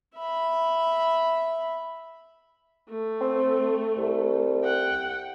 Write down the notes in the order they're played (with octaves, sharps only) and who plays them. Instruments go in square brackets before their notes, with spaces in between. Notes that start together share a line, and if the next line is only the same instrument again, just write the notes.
[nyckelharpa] E5 B5
[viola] A3
[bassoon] C4
C2
[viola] F#5 G5